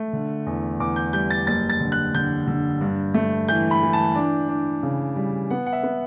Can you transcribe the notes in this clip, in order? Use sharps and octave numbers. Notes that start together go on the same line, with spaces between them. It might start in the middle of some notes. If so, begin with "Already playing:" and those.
Already playing: A3
D3
E2
E2 D6
G6
G3 G6
A6
F#1 A6
A6
D3
F#6
D3 G6
D3
G2
A3
E3 G6
B5
E3
A5
D4
D4
C#3
G3
B3 F#5
F#5
E5
B3